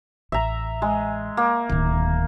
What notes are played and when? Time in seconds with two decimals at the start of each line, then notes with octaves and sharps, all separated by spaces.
0.32 A1 E5 A#5
0.82 G#3
1.37 A#3
1.70 D1 D#3